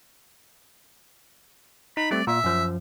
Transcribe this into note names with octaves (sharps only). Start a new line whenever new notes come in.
D#4 B5
G3 A3 C4 D5
A#2 E5
F#2 F3